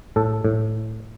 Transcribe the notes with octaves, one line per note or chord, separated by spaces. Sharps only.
A2 A4
A2